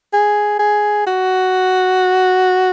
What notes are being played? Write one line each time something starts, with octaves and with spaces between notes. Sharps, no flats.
G#4
G#4
F#4